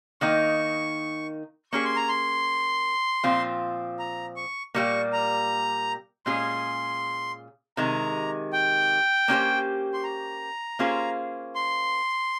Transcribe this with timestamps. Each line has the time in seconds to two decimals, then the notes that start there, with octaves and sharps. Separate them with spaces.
0.21 D#3 A#3 D#4 C#6
1.72 A#3 C#4 G#4 C#6
1.85 C6
1.97 A#5
2.09 C6
3.23 A#2 F3 C4 F4
3.99 A#5
4.36 C#6
4.75 A#2 G3 A#3 C#6
5.13 A#5
6.26 A#2 G#3 C#4 G#4 C6
7.77 C3 D#3 G#3 A#5
8.53 G5
9.28 A#3 C#4 G4 C5
9.94 C6
10.04 A#5
10.79 A#3 C#4 F4 G#4 C5
11.55 C6